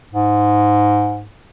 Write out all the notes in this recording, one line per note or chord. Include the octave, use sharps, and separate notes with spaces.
G#2